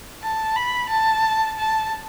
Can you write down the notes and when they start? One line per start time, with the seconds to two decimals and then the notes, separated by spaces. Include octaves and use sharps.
0.22 A5
0.56 B5
0.90 A5
1.58 A5